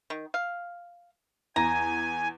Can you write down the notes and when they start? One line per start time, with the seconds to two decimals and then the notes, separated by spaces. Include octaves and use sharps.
0.10 D#3
0.34 F5
1.56 E2 G#5 A#5